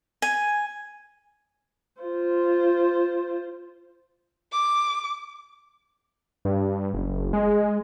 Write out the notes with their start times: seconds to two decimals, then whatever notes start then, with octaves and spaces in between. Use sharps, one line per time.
0.22 G#5
2.02 F4 C5
4.52 D6
6.45 G2
6.94 F#1
7.33 G#3